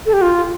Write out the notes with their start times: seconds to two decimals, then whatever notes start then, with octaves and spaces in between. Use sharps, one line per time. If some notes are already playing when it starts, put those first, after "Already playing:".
0.06 A4
0.13 G4
0.22 F4